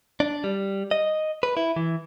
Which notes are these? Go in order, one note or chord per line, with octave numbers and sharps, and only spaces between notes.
D4
G3
D#5
B4
E4
E3